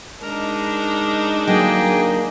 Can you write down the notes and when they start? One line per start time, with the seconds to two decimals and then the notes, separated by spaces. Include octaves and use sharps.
0.22 G#3 D4 D#4 A#4 A#5
1.47 D3 F#3 A#3 G4 G#4 D#5 G5